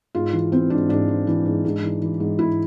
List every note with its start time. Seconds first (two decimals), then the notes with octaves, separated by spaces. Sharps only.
0.15 G#2 F4
0.33 E3
0.52 E3 C4
0.70 G#2 D4
0.89 G#2 D4
1.08 E3
1.27 E3
1.46 G#2
1.65 G#2
1.83 E3
2.02 E3
2.20 G#2
2.39 G#2 E4